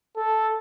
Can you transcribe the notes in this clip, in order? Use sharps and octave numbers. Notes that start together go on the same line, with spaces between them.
A4